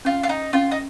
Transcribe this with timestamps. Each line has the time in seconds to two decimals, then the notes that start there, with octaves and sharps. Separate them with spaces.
0.05 C#4 F4
0.23 F4
0.29 D#4
0.53 C#4 F4
0.71 D#4